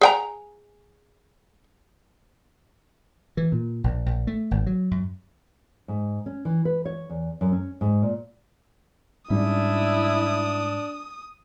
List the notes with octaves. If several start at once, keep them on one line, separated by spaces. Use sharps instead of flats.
G#4 G5 A#5
E3
A#2
A#1
A#1
A3
G#1
F#3
F#2
G#2
C#4
E3
B4
C#5
E2
F#2
C#4
G#2
A#2
G#2 G3 C#4 D4 E4 D#6